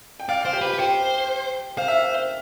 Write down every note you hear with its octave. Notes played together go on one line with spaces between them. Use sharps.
G5
D5 F5
F5
C5
G4 G5
B4
G4 G5
B4
G4 C5 G5
C5 F5
E5
F5